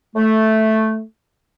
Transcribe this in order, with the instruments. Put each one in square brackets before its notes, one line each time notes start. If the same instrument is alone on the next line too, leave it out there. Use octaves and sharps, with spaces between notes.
[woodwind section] A3